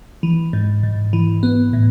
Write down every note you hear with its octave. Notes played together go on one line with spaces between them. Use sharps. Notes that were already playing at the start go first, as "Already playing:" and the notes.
E3
G#2
G#2
E3
B3
A2